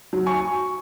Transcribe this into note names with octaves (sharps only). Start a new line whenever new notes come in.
F#3
G#5 C#6